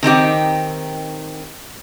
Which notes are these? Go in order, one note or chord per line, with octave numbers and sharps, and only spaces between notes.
D#3 C4 D#4 G4